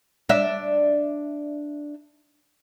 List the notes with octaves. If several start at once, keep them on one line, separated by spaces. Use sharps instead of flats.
D4 E5